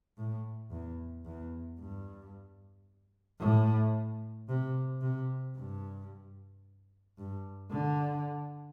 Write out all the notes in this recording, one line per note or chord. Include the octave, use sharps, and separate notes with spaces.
A2
E2
E2
G2
A2
C3
C3
G2
G2
D3